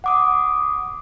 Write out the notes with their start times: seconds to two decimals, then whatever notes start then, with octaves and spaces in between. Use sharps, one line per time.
0.04 F#5 D6 D#6